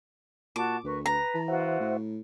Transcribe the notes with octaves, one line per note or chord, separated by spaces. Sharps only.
A#2 F#4 A5 C#6 D6
D2 A#4 B4 C#6
B4 A#5
E3 A5
F4 F#4 C5 E5 F#5
A2